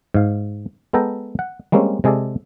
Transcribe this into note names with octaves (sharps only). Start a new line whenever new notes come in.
G#2 F5
G#3 B3 A4 G5 A#5
F#5
G3 G#3 A#3 C4 C#4
C3 G#3 G#4 A4 D5